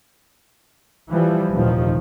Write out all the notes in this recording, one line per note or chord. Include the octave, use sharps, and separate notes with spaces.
E3 F3 G3
F1 D#2 A#2 D#3 F3